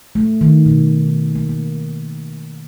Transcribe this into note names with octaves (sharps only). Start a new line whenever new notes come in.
A3
D#3
B2
A#3
A#3